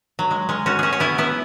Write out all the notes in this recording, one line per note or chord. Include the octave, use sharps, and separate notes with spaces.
F#3
G#3
G#3 C#4
C#4 F#4
C#4 F#4 G#4
C#4
B3 E4
B3 E4